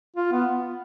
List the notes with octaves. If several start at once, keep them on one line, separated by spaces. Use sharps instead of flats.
F4
B3